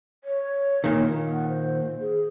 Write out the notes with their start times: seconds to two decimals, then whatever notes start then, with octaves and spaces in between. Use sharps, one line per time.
0.24 C#5
0.84 A#2 D#3
1.32 F#5
1.48 C5
2.00 G#4